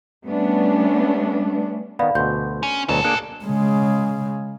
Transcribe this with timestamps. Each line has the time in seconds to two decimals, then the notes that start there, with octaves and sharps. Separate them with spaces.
0.25 G3 A3 B3 C#4 D4
1.99 D#3 B3 D5 F5 B5
2.15 D2 B2 C6 G6
2.63 C#4
2.89 D2 B2 F#3 A#4 A5
3.04 A#3 D4 G#4 F#6 C#7 D7
3.44 C#3 G#3